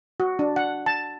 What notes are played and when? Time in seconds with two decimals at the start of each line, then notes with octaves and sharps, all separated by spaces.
0.20 F#4
0.39 D4
0.56 F#5
0.86 A5